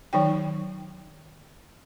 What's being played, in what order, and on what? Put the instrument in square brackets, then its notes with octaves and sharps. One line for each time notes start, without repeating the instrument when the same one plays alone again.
[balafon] D#3 F#3 D#4 G5